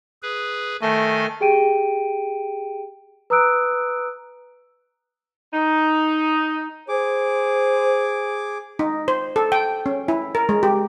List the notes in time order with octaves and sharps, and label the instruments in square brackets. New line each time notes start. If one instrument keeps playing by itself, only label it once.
[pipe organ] G#4 B4
[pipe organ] D#3 D#5 G#5 [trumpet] A3
[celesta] G4 G#4 G5 D7 D#7
B4 A#5 D#6 E6 F#6 D7
[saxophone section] D#4
[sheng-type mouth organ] G#4 D6 [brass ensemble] C5
[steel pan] D#4
C5
A4
G5
C#4
E4
A#4
G#3
G4